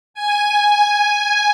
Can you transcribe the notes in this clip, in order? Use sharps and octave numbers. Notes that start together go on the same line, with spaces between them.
G#5